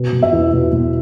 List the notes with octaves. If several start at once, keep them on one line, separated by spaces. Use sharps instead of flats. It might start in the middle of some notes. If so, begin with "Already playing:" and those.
Already playing: B2
B2
E5
E2
B2
B2